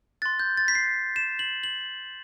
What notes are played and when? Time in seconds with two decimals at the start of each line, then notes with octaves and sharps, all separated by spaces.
0.22 C6 F#6 A6
0.40 G6
0.57 A6
0.68 B6
0.75 C7
1.16 E7
1.39 F#7
1.64 F#7